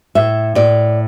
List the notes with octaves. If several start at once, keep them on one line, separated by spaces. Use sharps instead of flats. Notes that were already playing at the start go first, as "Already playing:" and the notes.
A2 E5
A2 D5